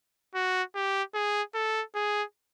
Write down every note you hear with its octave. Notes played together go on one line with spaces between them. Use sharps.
F#4
G4
G#4
A4
G#4